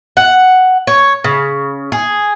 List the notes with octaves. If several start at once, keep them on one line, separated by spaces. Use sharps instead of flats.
F#5
C#5
C#3
G#4